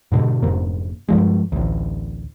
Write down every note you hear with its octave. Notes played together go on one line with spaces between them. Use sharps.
G#2 B2 D3
F1 G#2 A#3
G2 F3 G#3
A1 D2